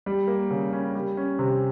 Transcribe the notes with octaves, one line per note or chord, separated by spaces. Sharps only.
G3
A#3
C#3
C#4
G3
C#4
C3